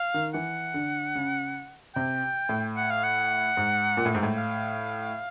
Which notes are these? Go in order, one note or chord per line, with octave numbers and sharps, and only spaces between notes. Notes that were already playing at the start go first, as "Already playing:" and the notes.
Already playing: F5
D#3
E3 F#5
D3
C#3
C3 G5
A2
F#5
F5
F#5
G#2
A#2
A2
G#2
A2
F5